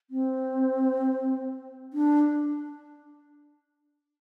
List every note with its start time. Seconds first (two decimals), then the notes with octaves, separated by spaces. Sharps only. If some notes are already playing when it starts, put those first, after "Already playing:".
0.10 C4
1.93 D4